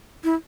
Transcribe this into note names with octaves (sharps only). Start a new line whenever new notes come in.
E4